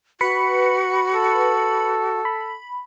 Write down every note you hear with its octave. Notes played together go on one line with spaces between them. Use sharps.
F#4 B4 B5 C#7
A4
B5